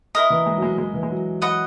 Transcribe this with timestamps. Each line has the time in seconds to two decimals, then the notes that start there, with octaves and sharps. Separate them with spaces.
0.15 E4 A#4 D#5 A#5
0.30 E3
0.46 G#3
0.57 F#3
0.62 G#3
0.78 G#3
0.94 E3
1.03 G#3
1.10 F#3
1.42 B4 D#5 F#5